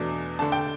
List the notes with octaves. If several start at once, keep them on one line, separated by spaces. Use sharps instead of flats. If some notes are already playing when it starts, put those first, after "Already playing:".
Already playing: E2 B2 A3 D4
D3 A3 D4 A5
G5